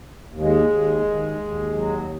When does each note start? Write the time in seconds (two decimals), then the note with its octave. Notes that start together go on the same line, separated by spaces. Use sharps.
0.27 D#2
0.40 G#3
0.65 D#2
1.01 D#2
1.37 D#2
1.74 F#3